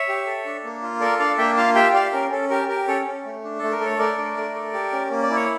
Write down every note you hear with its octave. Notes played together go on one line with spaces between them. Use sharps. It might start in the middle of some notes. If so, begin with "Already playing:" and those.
Already playing: C#5 E5
G4
A4
D4
A#3
F4
A4 A#4 D5
D4 D5 F5
A#3 E5 G5
F4 F5 A5
G4 E5 G5
G4 D5 F5
C#4 A#4
C#4 A4
G4 A#4
G4 A#4
C#4 A4 C#5
C#4
A3
D4
A3 A4
A#4
A4 C#5
A3 A#4 D5
D4
A3
A4
G4
C#4
A#3
D5
E4
C#5